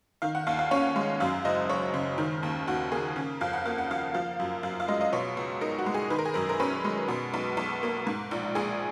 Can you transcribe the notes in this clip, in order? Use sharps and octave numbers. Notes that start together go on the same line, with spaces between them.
D#3 F5
F#5
D#2 F5
F5
C#4 C#5
G#3
F#2 F5
F#1 D#5
F#1 C#5
C#3
D#3
D#2
D#2 F#4
A#3 G#4
C#3
F2 F5
F#5
A#3 F5
F#5
F3 F5
F3 F5
F#2
F#2 F5
F5
G#3 D#5
D#5
B2 C#5
C#2
D#4 A#4
F#4
G#3
G#4
D#3 B4
A#4
G#4
F#2 A#4
A#4
C#4 B4
G#3
B2
B1
B1
A#3
G#2
A#1
A#1 G#4